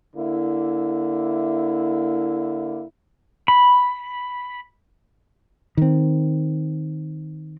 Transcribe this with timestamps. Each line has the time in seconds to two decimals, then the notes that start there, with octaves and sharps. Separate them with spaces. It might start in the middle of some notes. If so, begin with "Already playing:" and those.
0.16 D3 A#3 E4
3.48 B5
5.77 D#3 C4